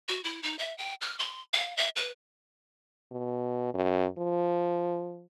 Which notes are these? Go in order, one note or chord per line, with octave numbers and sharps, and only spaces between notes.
F#4
E4
D#4
E5
G5
F6
C6
F5
E5
B4
B2
F#2
F3